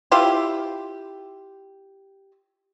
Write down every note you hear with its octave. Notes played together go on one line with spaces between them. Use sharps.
E4 F4 G4